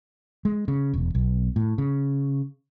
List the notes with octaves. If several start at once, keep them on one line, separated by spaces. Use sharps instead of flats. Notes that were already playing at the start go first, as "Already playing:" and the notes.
G#3
C#3
E1
B1
A2
C#3